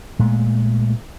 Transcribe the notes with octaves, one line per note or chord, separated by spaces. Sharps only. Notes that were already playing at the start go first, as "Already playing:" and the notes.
A#2 G#3 A3